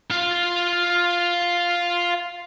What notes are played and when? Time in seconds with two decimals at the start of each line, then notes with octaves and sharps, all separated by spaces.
0.11 F4 F5